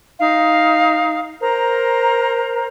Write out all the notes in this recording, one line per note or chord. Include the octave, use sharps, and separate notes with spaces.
D#4 F5
A#4 C5 A#5